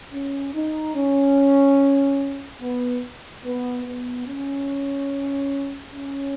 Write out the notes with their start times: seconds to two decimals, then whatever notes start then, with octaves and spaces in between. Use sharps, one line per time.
0.13 C#4
0.54 D#4
0.95 C#4
2.61 B3
3.44 B3
3.86 B3
4.26 C#4
5.93 C#4